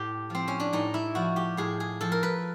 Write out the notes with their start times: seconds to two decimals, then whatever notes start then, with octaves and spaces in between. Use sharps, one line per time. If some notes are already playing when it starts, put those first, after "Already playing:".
Already playing: A2 G4
0.30 F3 C4
0.48 C#4
0.60 D4
0.73 A2 D#4
0.94 E4
1.15 F3 F#4
1.36 G4
1.57 A2 G#4
1.80 G#4
2.01 F3 A4
2.12 A#4
2.23 B4